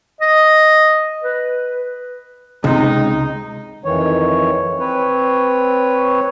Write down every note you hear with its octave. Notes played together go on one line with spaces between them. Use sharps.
D#5
B4
C#2 C3 D#4
F2 D#3 E3 C#5
C4 B4 C#5